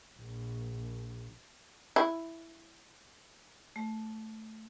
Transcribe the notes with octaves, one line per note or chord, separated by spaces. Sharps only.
A#1
E4
A3